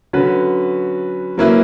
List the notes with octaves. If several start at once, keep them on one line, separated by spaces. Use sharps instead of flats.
D3 F#3 C#4 F#4 B4
F#3 A#3 C#4 E4 B4